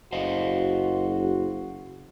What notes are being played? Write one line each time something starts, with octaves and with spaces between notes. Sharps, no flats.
F#1 F#4 C5 D#5 F5